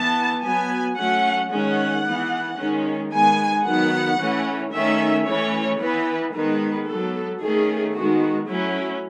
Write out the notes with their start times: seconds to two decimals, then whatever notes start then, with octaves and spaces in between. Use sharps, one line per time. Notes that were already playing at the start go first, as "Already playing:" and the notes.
Already playing: E3 B3 A5
0.43 F#3 B3 G#5
0.97 F#3 A3 C#4 F#5
1.51 D#3 G#3 C#4 F#5
2.05 E3 B3
2.58 D#3 G#3 C#4
3.11 D#3 G#3 B3 G#5
3.65 D#3 F#3 B3 F#5
4.19 E3 A3 C#4
4.73 D#3 A3 C#4 E5
5.26 E3 A3 C#4 C#5
5.80 E3 B3 B4
6.34 D#3 G#3 B3 B4
6.88 F#3 B3 A4
7.41 D#3 A3 C#4 G#4
7.95 D#3 G#3 B3 F#4
8.48 F#3 A3 C#4 E4